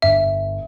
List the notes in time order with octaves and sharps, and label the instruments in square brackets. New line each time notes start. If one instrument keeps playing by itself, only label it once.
[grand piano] G1 [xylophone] E5